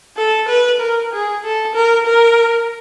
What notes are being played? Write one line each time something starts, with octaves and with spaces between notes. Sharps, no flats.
A4
B4
A#4
G#4
A4
A#4
A#4